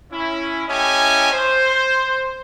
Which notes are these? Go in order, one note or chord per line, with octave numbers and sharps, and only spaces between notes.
C#4 E4
A3 C#4 E4 G4 D#5 G#5
C5